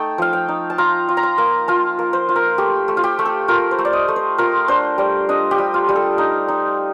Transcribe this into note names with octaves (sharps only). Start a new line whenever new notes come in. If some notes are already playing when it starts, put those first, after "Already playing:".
Already playing: A3 D#4 G5 A5
F3 F5
G5
D#4
A5
F4 A#5
F4
A#5
C6
A#3
F4 A5
A#3
C5
F4
A#4
A3 G4
A3
F4
G4
A3
A4
F4 A#4
C5
A3
D5
D#5
A3
C5
F4 A#4
D4 C5
G3 D5
D4 D#5
G4
G3
F4
G3
A4
D#4
D#4